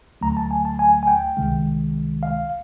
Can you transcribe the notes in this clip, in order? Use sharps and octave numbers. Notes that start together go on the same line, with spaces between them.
D2 D3 F#3 A3 A#5
A5
G#5
A5
G#5
G#5
G5
C2 C3 D#3 G#3
F5